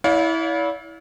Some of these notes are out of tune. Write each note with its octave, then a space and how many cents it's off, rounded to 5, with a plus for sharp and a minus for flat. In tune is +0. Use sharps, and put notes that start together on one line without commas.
E4 -15 D5 -45 F5 +30